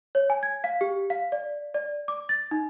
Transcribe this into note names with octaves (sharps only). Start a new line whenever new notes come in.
C#5
G#5
G#6
F5
G4
F5
D5
D5
D6
A6
D#4